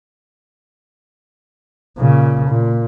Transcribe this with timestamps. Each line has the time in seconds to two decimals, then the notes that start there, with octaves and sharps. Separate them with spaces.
1.98 A#2 C#3
2.48 A#2